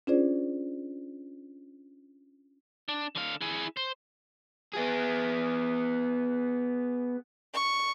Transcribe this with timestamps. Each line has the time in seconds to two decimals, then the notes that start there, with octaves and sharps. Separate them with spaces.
0.07 C#4 D4 F4 G#4 C5 D5
2.88 D4
3.15 D3 F5
3.41 E4 G#4
3.77 C5
4.73 B3 G#4
7.54 C#6